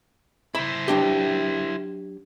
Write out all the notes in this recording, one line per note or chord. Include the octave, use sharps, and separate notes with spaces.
E4 C5 B5
F#3 D4 G4